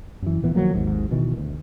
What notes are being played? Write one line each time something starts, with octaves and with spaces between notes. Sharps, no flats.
F#2 E3
D1 A#2 E3 B3
D#3 F3 F#3 A#3
G#1 D#2 G#2
B2 D#3 E3
D2